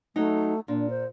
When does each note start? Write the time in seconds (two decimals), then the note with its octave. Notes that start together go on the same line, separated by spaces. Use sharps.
0.16 F#3 A3 D#4
0.68 A#2 D4
0.90 C5